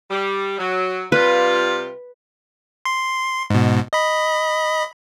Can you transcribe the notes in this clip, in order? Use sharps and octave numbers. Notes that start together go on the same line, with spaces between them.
G3
F#3
C3 G3 F4 B4
C6
G#2 B2
D#5 B5